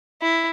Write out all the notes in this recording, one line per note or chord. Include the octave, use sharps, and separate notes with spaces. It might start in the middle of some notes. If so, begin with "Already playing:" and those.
E4